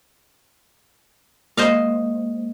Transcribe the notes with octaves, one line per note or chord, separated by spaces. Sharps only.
G#3 A#3 C5 D#5 F5